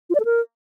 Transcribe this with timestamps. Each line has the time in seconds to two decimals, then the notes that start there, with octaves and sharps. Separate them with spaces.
0.10 F4
0.15 D5
0.20 A4
0.25 A#4